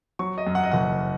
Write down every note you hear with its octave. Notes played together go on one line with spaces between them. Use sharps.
F#3 C#6
D#5
F#2
F#5
D#5
F#1 F#5